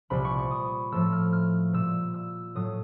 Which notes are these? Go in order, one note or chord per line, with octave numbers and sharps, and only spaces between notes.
C2 A#2 G3 B5
C#6
C#6
D#6
A2 F3 A3 E6
F6
F6
A#2 G3 E6
E6
A2 F#3 A3 D#6